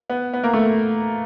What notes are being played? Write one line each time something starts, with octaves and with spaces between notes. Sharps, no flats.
B3
B3
A#3
A3